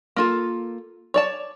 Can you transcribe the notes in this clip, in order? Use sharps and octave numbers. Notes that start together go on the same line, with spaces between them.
A#3 F4 A4
C#5 D5 A5